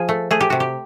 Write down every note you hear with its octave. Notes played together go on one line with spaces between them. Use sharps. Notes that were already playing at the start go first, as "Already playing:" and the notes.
Already playing: F3 G#4
A3
A3 G#4
G4
C3 F#4
G4